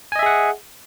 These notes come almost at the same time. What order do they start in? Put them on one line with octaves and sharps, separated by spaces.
G#5 D#5 E5 G#4 F#5